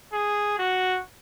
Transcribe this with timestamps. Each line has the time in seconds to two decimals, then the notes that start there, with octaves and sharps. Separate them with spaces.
0.13 G#4
0.58 F#4